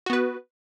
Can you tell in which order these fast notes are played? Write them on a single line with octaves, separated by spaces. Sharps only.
F#4 B3 B4